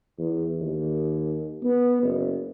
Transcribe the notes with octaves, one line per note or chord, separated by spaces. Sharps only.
E2
D#2
B3
F#1